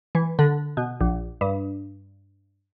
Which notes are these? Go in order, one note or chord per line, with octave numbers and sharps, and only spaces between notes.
E3
D3
B2
A#1
G2